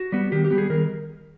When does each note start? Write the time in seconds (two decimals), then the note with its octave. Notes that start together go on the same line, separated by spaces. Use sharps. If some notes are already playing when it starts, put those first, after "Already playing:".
Already playing: F#4
0.12 G3 B3
0.32 D#3 G4
0.45 G4
0.51 G3 B3
0.58 G#4
0.70 D#3 A#4